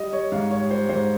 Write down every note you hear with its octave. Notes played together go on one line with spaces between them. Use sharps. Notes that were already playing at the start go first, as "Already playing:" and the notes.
Already playing: G3 D#5
G3 C#5
G#2 F5
G3 C#5
G3 C5
G#2 C5